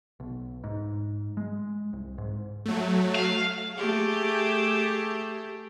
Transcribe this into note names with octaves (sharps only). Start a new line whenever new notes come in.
B1
G#2
G#3
C2
G#2
F#3 A3
F5
A3 G4 G#4